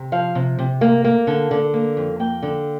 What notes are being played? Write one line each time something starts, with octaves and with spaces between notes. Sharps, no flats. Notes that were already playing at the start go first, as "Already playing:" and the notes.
Already playing: C3
F3 F5
C3
C3
A#3
A#3
D3
D3
A#3
F2
A#3 G5
D3